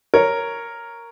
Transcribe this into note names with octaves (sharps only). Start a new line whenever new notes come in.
A#4 C#5